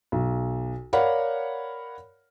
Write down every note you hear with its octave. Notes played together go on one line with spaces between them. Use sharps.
B1
A#4 C#5 D5 F5 F#5 B5